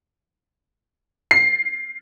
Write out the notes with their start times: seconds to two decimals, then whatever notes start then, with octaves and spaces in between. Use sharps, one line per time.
1.31 C7